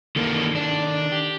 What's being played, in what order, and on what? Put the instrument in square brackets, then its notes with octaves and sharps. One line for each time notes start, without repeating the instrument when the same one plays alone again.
[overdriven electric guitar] D#3 A4 [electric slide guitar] E3 A#3
[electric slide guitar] D4
[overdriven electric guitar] G4